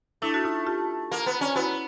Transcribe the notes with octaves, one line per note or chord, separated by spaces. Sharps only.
A3 D4 E4
F#4
D#4 F4
F4 G4
A#3
B3
C#4
B3 E4 F#4